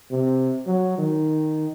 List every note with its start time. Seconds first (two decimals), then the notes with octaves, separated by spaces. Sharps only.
0.11 C3
0.66 F#3
0.98 D#3